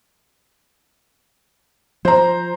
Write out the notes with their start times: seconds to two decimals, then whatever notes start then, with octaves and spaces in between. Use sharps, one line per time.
2.05 F3 C5 A#5